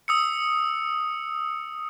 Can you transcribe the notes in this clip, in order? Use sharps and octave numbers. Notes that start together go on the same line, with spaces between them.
D#6 E6 C#7